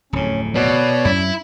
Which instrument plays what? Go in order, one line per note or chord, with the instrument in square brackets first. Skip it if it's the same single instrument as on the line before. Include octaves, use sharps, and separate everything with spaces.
[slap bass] D1 F2 A2 [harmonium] C#4
[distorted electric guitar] B2 [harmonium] C#5 D5
[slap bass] F#2 C#4 [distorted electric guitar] E4